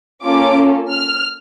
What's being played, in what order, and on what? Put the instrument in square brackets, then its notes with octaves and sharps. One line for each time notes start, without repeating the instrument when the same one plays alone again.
[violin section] A#3 C#4 F4 A4 D6
F6